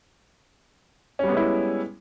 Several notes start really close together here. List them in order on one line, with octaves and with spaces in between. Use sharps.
C#4 G3 B3 G#3 E4